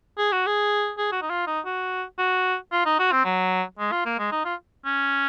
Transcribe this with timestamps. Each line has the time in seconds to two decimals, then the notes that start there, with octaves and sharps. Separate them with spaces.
0.18 G#4
0.32 F#4
0.47 G#4
0.98 G#4
1.12 F#4
1.22 D#4
1.30 F4
1.47 D#4
1.66 F#4
2.19 F#4
2.72 F4
2.86 D#4
2.99 F#4
3.12 C4
3.25 F#3
3.79 G#3
3.92 F4
4.06 A#3
4.19 G#3
4.32 D#4
4.45 F4
4.86 C#4